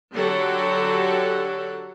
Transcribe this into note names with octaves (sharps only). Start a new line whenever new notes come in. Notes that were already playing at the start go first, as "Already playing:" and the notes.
D3 F#3 F#4 G4 A4 F#5